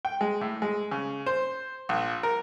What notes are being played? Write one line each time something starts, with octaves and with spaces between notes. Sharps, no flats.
G5
G#3
A2
G#3
C#3
C5
A#1
A#4